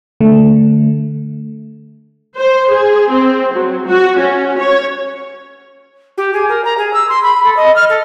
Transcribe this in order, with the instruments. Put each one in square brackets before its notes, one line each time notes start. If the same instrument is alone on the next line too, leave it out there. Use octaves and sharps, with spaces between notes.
[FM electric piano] D3 A3
[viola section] C5
G#4
C4
F#3
F#4
C#4
C#5
[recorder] G4
G#4
A#4
A#5
G#4
E6
C6
B5
A4
D#5
F6
A4